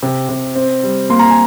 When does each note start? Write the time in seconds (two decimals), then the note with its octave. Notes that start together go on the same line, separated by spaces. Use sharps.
0.03 C3
0.29 C3
0.55 C4
0.83 G3
1.09 A#3 C6
1.19 A#5
1.30 G#5